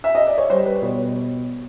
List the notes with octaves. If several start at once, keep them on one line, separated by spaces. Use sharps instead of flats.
E5
D#5
D5
C#5
G3 C5
B4
B2 C#5